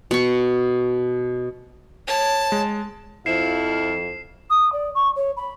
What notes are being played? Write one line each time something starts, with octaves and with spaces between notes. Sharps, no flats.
B2 C#6
C#5 A5
G#3
F2 F3 E4 F5 C7 E7
D#6
D5
C#6
C#5
B5